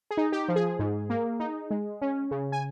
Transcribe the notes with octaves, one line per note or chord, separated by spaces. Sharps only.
G#4
D#4
G4
F3
G#4
G#2
A#3
D#4
G#3
C#4
C#3
G#5